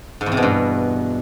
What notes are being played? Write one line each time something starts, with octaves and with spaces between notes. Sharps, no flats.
G#2
E2
C3
B2
G2